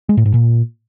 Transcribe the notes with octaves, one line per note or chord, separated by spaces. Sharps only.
G#3
A2
G#2
A#2